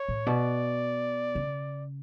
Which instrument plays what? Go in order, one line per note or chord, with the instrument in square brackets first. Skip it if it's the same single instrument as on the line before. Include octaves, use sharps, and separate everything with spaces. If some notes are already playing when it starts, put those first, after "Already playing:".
Already playing: [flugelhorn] C#5
[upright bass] A2
[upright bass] B2 [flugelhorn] D5
[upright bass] C#3